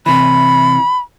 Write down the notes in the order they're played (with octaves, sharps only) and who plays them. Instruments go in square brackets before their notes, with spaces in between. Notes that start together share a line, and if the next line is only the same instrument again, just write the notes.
[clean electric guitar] C3 E3 [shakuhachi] B5